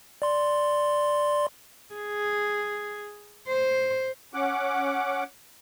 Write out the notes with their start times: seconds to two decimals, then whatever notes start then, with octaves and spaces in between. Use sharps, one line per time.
0.22 D5 C6
1.94 G#4
3.48 C5
4.34 C#4 F#5 D6